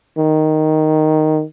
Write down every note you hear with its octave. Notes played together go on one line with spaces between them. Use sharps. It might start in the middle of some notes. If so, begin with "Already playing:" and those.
D#3